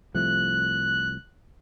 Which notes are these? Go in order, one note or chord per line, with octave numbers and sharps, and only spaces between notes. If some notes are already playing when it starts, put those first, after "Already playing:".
C2 F3 A3 F#6